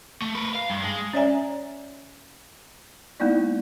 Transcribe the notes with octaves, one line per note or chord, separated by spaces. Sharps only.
A3
A#4 B4
F5
G2
G#3
C#4 C#5 D5 E5 G#5 A#5
G#3 A#3 B3 D#4 E4 D5